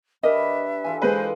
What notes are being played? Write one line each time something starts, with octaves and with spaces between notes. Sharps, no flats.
D4 G4 A#4 B4 D#5 E5
E3 F4 A4 G#5
G#3 B4 C5